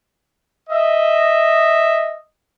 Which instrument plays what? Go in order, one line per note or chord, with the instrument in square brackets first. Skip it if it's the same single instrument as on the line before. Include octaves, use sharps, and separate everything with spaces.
[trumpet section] D#5 E5